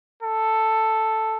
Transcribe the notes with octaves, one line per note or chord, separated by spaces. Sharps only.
A4